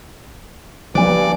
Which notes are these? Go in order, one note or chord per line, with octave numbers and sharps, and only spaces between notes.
G2 F3 F#3 A#3 B4 D5 G#5